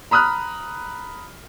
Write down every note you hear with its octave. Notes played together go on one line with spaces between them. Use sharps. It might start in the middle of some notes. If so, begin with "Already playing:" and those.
A#5 B5 D#6 F6 F#6